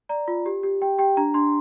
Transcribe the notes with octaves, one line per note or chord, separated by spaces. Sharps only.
D5 A#5
F4
G4
G4
G4 G5
G4 G5
D4 A#5
D4 C6